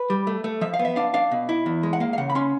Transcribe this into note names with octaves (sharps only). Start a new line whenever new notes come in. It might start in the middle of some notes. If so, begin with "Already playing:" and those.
Already playing: B4
G3
A3
A3
F3 E5
F5
B3
E5
D4 F5
D4 F5
B2
E4
E2
G#3
F#5
A#3 F5
F5
C#3 F#5
B5
C#4 C6